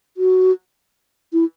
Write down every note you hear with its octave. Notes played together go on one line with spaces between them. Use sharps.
F#4
E4